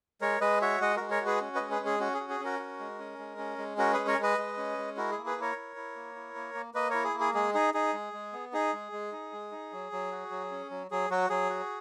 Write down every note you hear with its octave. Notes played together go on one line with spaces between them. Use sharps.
G#3 A#4 C#5
G#3 B4 D#5
F#4 C#5 E5
G#3 D#5 F#5
G#3 F#4 A#4
A#4 C#5
F#4
G#4 B4
C#4
G#3 B4 D#5
G#4 B4
C#4
G#4
C#4 F#4
G#4
F#4
G#4
C#4 F#4 A#4
F#4
G#3
C#4
G#3
C#4
G#3
C#4 F#4 A#4
G#4 B4
G#3
A#4 C#5
G#3 B4 D#5
G#3
C#4
G#3
E4 F#4 A#4
G#4
A#3
G#4 B4
E4
A#4 C#5
E4
E4
A#3
E4
A#3
A#3
A#3 B4 D#5
E4 A#4 C#5
G#4
A#3
G#4
G#3 G#4
D#4 G#4
D#4 G#4
G#3
G#3
B3
D#4 G#4
G#3
G#3
D#4
G#3
D#4
F#3
F#3
F#4
F#3
C#4
F#3
F#3 G#4
F#3 F#4
F#3 G#4
F#4